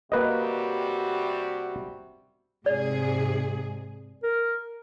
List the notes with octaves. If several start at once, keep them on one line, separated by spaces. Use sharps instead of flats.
C3 G3 A#3 F#4 B4 D#5
G#2 C3 G#4 D5
A#4